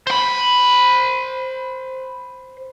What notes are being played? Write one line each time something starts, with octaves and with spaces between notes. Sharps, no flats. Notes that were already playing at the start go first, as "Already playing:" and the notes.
C5 B5